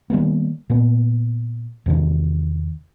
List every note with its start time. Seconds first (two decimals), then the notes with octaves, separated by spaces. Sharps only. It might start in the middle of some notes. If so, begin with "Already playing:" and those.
0.10 D#3 G3 A#3 B3
0.70 A#2 B3
1.86 E2 C3 D#3